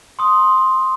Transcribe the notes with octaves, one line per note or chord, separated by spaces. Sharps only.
C6 D#6